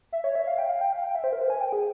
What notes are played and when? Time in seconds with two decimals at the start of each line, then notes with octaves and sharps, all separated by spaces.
0.13 E5
0.24 C#5
0.35 E5
0.47 F5
0.58 G5
0.69 F5
0.81 G5
0.92 F5
1.04 G5
1.15 E5
1.24 C5
1.33 A#4
1.41 C5
1.50 G#5
1.61 G5
1.73 G#4